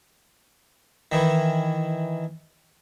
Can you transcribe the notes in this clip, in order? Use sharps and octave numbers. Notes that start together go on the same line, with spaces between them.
D#3 E3